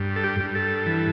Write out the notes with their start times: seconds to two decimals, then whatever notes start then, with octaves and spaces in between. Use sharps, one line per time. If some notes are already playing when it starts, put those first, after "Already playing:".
Already playing: G2
0.16 A4
0.24 G4
0.40 G2
0.55 A4
0.86 E3